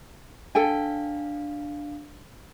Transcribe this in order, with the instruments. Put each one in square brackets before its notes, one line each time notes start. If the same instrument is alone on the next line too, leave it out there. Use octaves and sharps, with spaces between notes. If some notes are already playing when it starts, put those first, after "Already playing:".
[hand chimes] D4 F5 [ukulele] A4 G5 G#5